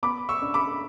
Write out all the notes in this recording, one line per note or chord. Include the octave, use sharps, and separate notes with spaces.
B3 B5 D6
C#6 E6
D4
B5 D6